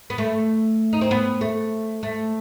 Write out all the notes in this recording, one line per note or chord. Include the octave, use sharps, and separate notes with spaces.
B3
A3
D#4
C4
B3
A3
A3